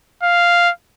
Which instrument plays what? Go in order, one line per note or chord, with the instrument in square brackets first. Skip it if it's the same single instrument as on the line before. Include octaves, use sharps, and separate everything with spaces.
[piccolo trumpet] F5